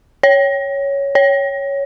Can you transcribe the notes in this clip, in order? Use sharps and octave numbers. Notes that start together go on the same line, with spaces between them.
C#5
C#5